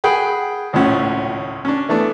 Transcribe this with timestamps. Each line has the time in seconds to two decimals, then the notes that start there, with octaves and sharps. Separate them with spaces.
0.04 G#4 F#5 G5 B5
0.73 G#1 C#2 A2 F3 C#4 F#5
1.65 C#4 D4
1.89 E3 A3 B3 D4